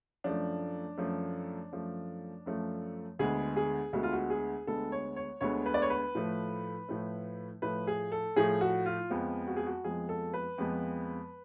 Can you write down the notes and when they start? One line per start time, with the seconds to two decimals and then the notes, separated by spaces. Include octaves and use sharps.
0.24 F#2 F3 A3 D4
0.98 F#2 F3 A3
1.72 F#2 F3 A3
2.46 F#2 F3 A3
3.19 D2 D3 G#3 B3 G#4
3.56 G#4
3.93 D2 D3 G#3 B3 F#4
4.03 F4
4.13 F#4
4.30 G#4
4.67 D2 D3 G#3 B3 A4
4.92 C#5
5.16 C#5
5.41 D2 D3 G#3 B3 C#5
5.66 B4
5.74 D5
5.82 C#5
5.90 B4
6.15 A2 F3 A3
6.89 A2 F3 A3
7.62 A2 F3 A3 B4
7.87 G#4
8.12 A4
8.36 A2 F3 A3 G#4
8.61 F#4
8.86 F4
9.10 F2 F3 G#3 B3
9.47 F#4
9.56 G#4
9.66 F#4
9.84 F2 F3 G#3 B3 G#4
10.09 A4
10.34 B4
10.58 F2 F3 G#3 B3